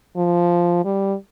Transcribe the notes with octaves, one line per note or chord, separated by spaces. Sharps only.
F3
G3